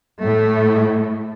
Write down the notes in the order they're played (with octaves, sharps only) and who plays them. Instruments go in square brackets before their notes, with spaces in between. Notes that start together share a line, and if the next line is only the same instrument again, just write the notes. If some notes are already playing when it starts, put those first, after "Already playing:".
[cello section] A2 A3